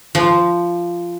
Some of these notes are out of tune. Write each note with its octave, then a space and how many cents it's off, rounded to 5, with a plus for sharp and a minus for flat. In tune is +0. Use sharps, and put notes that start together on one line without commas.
F3 -10